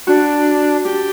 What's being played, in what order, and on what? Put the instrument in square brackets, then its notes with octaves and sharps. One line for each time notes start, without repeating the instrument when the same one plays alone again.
[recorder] D4 [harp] F#4
[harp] D4 [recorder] G4